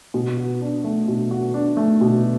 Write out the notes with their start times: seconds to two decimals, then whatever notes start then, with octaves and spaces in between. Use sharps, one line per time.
0.14 B2
0.37 F#4
0.61 D4
0.84 A3
1.08 B2
1.31 F#4
1.54 D4
1.77 A3
2.01 B2